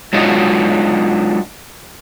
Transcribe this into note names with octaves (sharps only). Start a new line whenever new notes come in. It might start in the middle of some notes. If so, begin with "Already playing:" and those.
F#3 G#3 D4 D#4 F4 F#4